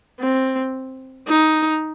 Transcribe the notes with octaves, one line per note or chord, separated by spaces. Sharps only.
C4
D#4